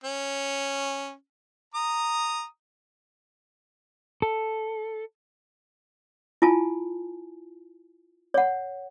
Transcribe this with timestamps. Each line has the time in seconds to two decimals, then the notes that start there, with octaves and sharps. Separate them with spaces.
0.04 C#4
1.74 A#5 D#6
4.22 A4
6.42 E4 F4 G#5 A5
8.34 C#5 F#5